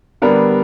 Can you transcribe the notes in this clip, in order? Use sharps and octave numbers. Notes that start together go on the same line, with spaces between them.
D3 G3 B3 D4 A#4